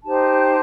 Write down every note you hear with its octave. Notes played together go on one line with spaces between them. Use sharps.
D#4 G4 C5 A5